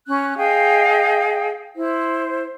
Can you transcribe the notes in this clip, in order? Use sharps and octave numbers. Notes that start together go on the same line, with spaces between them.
C#4 F#6
G#4 D#5 F5 G5
E4 C5